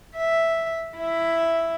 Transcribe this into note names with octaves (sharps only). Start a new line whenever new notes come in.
E5
E4 E5